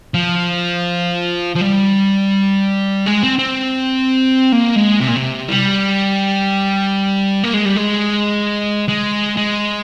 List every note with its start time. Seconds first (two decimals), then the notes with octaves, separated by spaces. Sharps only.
0.14 F3
1.55 F3
1.61 G3
3.06 G#3
3.23 C4
3.38 C4
4.52 A#3
4.76 G#3
5.01 C3
5.08 A#2
5.16 C3
5.49 G3
7.44 A#3
7.54 G#3
7.65 G3
7.76 G#3
8.88 G#3
9.37 G#3